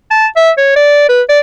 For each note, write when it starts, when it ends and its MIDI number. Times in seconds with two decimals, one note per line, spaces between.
0.11 0.26 81
0.36 0.50 76
0.57 0.72 73
0.76 1.08 74
1.09 1.22 71
1.29 1.40 74